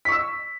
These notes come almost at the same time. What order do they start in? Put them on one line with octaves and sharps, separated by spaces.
B6 C#6 E6